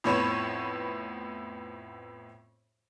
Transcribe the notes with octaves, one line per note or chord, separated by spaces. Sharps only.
F2 A2 B3 C#5 B5 E7